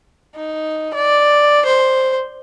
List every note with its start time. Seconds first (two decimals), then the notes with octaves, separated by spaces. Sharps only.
0.36 D#4
0.94 D5
1.66 C5